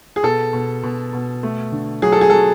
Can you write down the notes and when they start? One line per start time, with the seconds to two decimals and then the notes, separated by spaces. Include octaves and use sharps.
0.16 G#4
0.23 B2 A4
0.53 B2
0.83 B2
1.13 B2
1.43 A3
1.72 D3
2.02 F#3 G#4
2.12 A4
2.21 G#4
2.30 F#3 A4